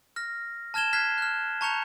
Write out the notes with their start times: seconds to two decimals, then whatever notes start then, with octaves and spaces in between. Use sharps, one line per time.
0.16 F6 A#6
0.74 A5 F6 G#6 E7 G7
0.93 F6 F#6 G#6 B6 C7
1.18 F6 F#6
1.61 A5 A#5 C#6 G6 C#7 F7